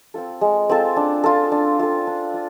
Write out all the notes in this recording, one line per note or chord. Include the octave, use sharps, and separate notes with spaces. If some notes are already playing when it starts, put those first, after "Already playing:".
C4 F4 A4
G#3
C4 F4 A4
D4
F4 A4
D4
F4 A4
D4
F4